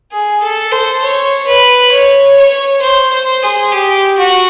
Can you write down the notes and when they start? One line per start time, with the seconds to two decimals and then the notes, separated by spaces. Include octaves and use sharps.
0.12 G#4
0.42 A4
0.72 C5
1.02 C#5
1.47 B4
1.92 C#5
2.37 C#5
2.82 C5
3.12 C5
3.43 G#4
3.72 G4
4.18 F#4